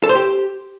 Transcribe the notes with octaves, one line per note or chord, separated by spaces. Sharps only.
A4
C5
G4